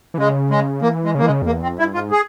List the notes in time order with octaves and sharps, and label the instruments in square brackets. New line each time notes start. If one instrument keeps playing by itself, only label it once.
[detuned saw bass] E3
[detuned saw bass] C#3 [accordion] G#3
[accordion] G#3
[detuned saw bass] E3 [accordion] A#3
[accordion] G#3
[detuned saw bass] C#3
[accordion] A#3
[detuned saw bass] E3
[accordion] G#3
[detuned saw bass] C#3
F2
[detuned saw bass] E2 [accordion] A#3
[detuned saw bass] F2 [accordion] C4
[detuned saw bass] G2 [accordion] E4
[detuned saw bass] G#2 [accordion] F4
[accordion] G#4